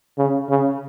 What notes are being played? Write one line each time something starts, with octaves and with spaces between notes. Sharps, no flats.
C#3
C#3